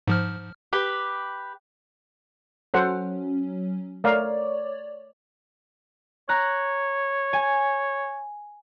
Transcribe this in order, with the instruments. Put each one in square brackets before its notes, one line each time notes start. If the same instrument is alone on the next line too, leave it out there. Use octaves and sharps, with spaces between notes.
[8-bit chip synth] G#2 F3 F6
[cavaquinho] G4 B4
[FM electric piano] F#3 C#4 [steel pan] A4 C5 F#5
[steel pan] A3 A#4 F5 [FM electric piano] C#5 D5
[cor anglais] C#5 [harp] A#5 F#6
[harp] G#5